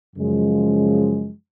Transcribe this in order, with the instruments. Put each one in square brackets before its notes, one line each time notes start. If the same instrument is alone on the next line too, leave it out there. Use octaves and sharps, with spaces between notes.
[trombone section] F#2 C#3 F3 G#3